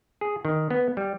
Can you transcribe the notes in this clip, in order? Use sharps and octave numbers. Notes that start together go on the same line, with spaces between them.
G#4
D#3
B3
G3